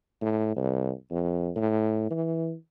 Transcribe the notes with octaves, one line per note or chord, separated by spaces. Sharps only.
A2
C2
F2
A2
E3